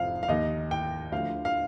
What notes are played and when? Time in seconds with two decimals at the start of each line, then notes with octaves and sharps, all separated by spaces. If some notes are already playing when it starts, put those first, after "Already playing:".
Already playing: F1 F2 C3 F3 F5
0.23 F5
0.28 D#2 D#3 D#5
0.71 G5
1.12 D2 D3 F3 F5
1.45 F5